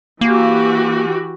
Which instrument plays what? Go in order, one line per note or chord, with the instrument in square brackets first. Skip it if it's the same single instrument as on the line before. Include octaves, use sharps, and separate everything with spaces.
[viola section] E3 F#4 G4 [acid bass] A#3